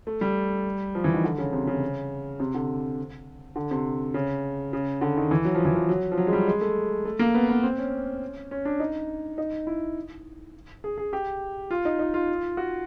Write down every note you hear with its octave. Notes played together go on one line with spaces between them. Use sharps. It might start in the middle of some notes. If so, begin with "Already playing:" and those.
A3
G3
F3
E3
D#3
D3
C#3
C3
C#3
C3
D3
D3
C3
C#3
C#3
D3
D#3
E3
F#3
F3
E3
F3
F#3
F3
F#3
G#3
G3
G#3
A3
A3
A#3
B3
B3
C4
C#4
C#4
D4
D#4
D#4
E4
G#4
G#4
G4
F4
D#4
D#4
F4
F#4